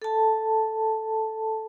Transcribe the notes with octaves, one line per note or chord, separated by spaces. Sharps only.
A4 A5